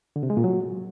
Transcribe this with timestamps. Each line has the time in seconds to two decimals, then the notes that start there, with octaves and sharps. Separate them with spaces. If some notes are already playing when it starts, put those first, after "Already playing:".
0.16 D3
0.23 C3
0.30 G#3
0.37 A#2
0.44 F#3